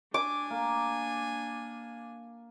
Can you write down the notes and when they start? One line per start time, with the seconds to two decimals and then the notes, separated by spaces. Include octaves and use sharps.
0.14 D4 G#5 D6
0.50 A#3